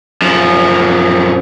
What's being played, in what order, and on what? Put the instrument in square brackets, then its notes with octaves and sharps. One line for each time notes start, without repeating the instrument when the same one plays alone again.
[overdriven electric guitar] F#2 F3